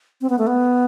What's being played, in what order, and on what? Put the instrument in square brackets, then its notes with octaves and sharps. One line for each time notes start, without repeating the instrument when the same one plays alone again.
[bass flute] C4
B3
A3
B3